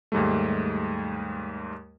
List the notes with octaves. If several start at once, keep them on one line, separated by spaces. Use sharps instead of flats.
D#2 G#2 G3 A3